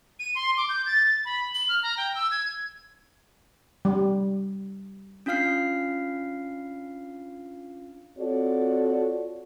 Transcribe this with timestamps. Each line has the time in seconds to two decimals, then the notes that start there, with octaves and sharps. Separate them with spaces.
0.19 D#7
0.35 C6
0.57 D6
0.69 G6
0.86 A6
1.25 B5
1.54 F#7
1.69 F6
1.83 A#5
1.97 G5
2.15 E6
2.31 G#6
3.85 G3
5.26 C#4 D4 F4 F5 F6 C7
8.18 C4 F4 F#4 A4 C#5 D5